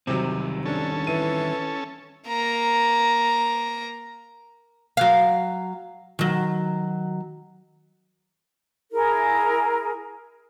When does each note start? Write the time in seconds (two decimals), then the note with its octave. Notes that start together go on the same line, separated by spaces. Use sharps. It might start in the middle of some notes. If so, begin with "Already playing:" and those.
0.07 C3 D#3 F#3 G3 C4
0.65 C#4 D4 A4
1.07 E3 D#7
2.27 A#3 A#5
4.97 F#3 F5
6.19 D#3 F#3
8.92 E4 G#4 A#4